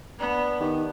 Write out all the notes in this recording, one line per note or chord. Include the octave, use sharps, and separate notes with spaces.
B3 D4
D#3 G4 D5